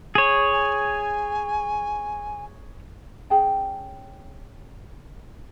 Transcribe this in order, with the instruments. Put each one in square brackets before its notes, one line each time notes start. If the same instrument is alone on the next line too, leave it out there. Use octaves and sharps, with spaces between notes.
[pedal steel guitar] G#4 C#5
[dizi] G#5
[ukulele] C#4 G#4 G5 A5